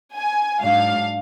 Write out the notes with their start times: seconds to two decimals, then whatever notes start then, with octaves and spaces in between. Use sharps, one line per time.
0.15 G#5
0.61 G#2 F#3 D4 F5